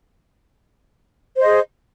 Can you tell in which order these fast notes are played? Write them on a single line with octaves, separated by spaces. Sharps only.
C5 D#5 G#4